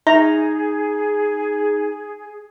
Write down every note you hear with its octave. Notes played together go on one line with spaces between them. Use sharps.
D#4 G#4 E5 A#5 C#6